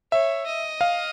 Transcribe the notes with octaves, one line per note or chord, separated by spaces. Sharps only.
C#5 E5
D#5
F5